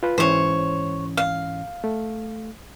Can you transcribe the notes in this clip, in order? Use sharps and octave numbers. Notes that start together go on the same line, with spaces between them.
F4 B4
G#2 E3 C#4 C5 C#5
F5
A3